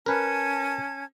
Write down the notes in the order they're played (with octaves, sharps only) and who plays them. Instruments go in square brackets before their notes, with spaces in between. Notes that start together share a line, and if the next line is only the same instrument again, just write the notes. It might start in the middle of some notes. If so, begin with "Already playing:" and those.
[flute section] C#4 A5 G#6 [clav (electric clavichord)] A#4 B4